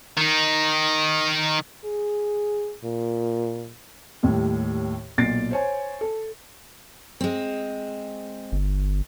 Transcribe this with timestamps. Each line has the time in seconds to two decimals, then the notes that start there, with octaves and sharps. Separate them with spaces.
0.17 D#3 D#4
1.84 G#4
2.84 A#2
4.23 D#2 A2 G3
5.18 B1 A#2 A6 C7 D7
5.51 C5 C#5 G#5
6.01 A4
7.21 G#3 C4
8.52 G1